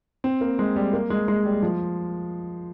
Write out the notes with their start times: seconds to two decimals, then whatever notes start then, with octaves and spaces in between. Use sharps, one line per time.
0.24 C4
0.41 A#3
0.59 G#3
0.76 G3
0.93 A#3
1.10 G#3
1.28 G#3
1.45 G3
1.62 F3